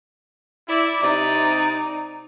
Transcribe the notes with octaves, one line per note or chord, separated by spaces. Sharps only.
E4 D5
C3 D#4 D5